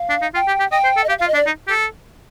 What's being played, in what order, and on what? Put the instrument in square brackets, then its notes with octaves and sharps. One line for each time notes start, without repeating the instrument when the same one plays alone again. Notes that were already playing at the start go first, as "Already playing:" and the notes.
Already playing: [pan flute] F5
[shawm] D4
D#4
[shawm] F4 [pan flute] G5
[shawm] G4
G4
[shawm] D#5 [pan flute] G5
[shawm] C5
A4
[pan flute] D#5
[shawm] G4 [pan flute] F5
[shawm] F4 [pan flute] F5
[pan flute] D#5
[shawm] D4
[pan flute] D5
[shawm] D#4
G4
A4